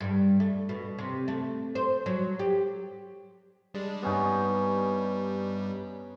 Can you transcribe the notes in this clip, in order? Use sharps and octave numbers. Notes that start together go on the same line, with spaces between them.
G2
A3
B2
C3
A3
C5
F#3
G4
G3 G#3 D4
G2 G3 B3 C#4 D#4